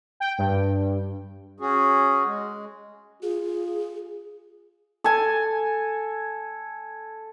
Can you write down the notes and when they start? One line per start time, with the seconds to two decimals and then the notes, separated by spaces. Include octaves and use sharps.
0.20 G5
0.38 G2
1.59 C#4 F#4 G#4
2.25 G#3
3.23 F4 G#4
5.04 A4 G#5